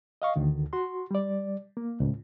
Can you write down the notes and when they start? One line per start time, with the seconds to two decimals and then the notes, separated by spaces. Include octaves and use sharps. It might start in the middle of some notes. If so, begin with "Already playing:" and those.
0.22 D#5 F5 C#6
0.36 D2 D3 D#3
0.73 F#4 C6
1.11 G3 D5
1.77 A#3
2.00 C#2 A2